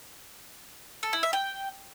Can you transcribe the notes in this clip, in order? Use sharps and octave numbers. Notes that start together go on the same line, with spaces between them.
A4
E4
E5
G5